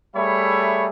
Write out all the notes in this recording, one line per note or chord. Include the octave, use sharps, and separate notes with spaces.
G3 A3 G#4 C#5 E5 B5